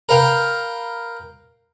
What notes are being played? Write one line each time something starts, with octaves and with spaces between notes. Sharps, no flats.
A#4 B4 F5 G5